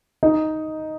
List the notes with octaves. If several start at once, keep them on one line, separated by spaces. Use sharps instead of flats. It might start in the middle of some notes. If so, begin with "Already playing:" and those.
D#4